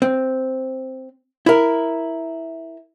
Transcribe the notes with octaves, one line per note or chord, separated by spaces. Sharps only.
C4
E4 A#4